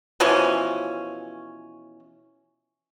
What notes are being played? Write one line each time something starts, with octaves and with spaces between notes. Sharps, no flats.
B2 E3 F3 C#4